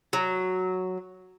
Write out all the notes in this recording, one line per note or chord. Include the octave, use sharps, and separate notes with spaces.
F#3